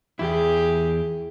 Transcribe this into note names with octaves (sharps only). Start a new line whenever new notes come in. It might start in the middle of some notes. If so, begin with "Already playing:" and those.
E2 E4 G4 G#4